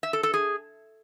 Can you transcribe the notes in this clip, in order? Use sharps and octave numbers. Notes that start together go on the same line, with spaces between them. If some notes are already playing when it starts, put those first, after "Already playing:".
E5
A4
A4
G#4